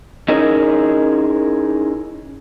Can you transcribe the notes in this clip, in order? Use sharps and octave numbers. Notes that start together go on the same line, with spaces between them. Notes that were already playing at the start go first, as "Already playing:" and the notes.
C#4 D#4 E4 G#4 A#4 D#5